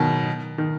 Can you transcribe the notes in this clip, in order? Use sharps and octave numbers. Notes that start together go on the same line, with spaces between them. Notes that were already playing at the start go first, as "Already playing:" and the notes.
Already playing: B2 D#3 F#3
D#3